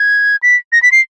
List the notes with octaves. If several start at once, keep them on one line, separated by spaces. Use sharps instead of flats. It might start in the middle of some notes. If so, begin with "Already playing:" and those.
Already playing: G#6
B6
A#6
B6
C7